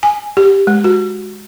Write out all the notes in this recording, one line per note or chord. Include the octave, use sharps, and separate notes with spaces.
G#5
G4
G#3
F#4